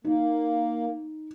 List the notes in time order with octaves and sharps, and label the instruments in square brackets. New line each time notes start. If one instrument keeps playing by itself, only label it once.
[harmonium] A#3 [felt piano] D#4